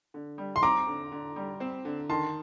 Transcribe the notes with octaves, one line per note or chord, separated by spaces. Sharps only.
D3
G3
C6
C4 A#5 D6
D3
D3
G3
C4
D3
D#3 A5 C6